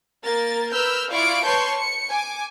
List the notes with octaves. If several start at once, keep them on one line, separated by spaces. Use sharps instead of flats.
A#3 A#4 A6
A#4 B4 E6 F6 G6
E4 F4 D5 F5 C#6 D7
B4 C#5 A5 C6 C#6 G6
C#7
G#5 D6